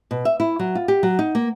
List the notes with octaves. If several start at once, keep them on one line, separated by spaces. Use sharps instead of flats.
B2
E5
E4
F#3
F4
G4
F#3
D#4
A#3